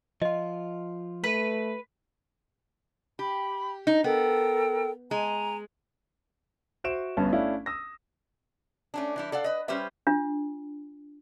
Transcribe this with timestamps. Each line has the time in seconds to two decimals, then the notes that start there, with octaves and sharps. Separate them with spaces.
0.22 F3 F4 D#5
1.24 A3 B4
3.19 G4 B5
3.87 D#4
4.04 B3 A4 A#4 G5
5.11 G#3 G#5 A#5
6.84 F#4 C5 E5 D7 E7
7.17 G1 G2 B3 C#4 A5
7.32 A3 C#4 D4 E4 F5
7.66 D#6 E6 A#6
8.94 A3 C#4 D4
9.16 E3 G3 E4
9.32 A4 D5 F5 F#5
9.44 B4 D#5
9.68 G3 C#4 G4 B4 C5 E5
10.07 D4 F4